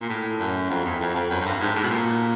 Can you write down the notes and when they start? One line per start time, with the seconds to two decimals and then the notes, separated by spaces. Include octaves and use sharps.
0.02 A#2
0.09 A2
0.39 F#2
0.70 F2
0.85 E2
1.00 F2
1.15 F2
1.30 F#2
1.41 F#2
1.45 G2
1.60 G#2
1.76 A2
1.83 B2
1.90 A#2